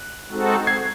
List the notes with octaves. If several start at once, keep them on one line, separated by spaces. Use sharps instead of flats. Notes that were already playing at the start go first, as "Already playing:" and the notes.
Already playing: F#6
G#3 C4 D#4 F#4 A4
G#6 C7